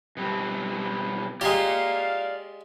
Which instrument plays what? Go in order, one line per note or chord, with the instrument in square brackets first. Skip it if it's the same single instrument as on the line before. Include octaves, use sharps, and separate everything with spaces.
[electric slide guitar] B2 G3 C4
[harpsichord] G#3 G4 [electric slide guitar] D5 A#5 [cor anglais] F5